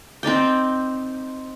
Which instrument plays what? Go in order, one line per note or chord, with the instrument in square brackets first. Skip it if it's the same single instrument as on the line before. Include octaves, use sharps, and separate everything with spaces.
[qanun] C4 D#4 D5 G5